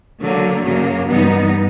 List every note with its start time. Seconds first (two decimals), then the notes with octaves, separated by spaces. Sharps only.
0.19 D3 F#3 A#3
0.64 F#2 C#3 F#3 A#3
1.08 G2 E3 G3 B3 D#4